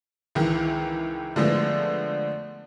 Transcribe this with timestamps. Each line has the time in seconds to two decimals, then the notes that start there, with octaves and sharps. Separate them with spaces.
0.35 C#2 D#3 E3
1.36 D3 F3 G#3 A3 B3